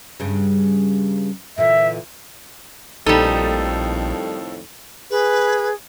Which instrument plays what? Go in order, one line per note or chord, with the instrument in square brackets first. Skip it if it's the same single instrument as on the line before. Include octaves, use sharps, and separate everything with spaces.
[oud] G2 C#3
[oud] A#2 D3 E3 [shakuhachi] E5
[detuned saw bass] A#1 [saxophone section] F2 A2 D#3 [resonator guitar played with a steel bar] G3 D#4 [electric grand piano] A4
[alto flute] G#4 [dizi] B4